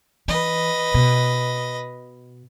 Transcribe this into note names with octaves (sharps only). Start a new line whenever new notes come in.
E3 B4 D#5
B2